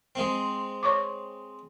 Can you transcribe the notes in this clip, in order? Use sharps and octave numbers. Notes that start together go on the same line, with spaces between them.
G#3 C4
C#5 C#6 D6